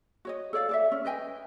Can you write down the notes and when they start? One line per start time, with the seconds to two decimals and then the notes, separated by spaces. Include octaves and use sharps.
0.25 F#4 C#5 D#5
0.53 A4 C#5 D5 F5
0.69 A4 D5 E5
0.92 C#4
1.05 B4 D#5 G5 G#5